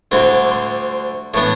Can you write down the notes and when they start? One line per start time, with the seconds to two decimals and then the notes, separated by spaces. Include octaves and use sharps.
0.11 D2 D3 G3 C4 E4
0.31 D6
0.51 C6
1.34 A2 E3 B3 D4 A5